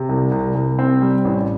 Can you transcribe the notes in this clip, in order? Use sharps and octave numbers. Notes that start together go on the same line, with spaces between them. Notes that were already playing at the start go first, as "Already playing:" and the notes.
Already playing: C3
C2
C2
C2
C4
G3
A1